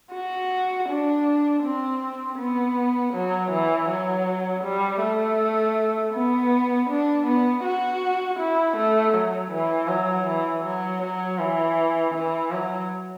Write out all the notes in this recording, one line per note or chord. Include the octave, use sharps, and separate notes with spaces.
F#4
D4
C4
B3
F#3
E3
F#3
G3
A3
B3
D4
B3
F#4
E4
A3
F#3
E3
F#3
E3
F#3
F#3
E3
E3
F#3